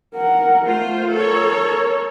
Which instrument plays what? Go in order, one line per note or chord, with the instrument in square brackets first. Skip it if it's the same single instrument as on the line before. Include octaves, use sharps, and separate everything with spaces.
[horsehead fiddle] A#4 F#5
[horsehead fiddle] A3 [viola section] F4 C5
[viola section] A4 C#5 [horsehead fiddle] A#4